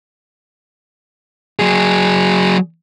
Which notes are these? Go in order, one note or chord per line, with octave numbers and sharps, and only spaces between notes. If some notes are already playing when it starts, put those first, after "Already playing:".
F#3 G#4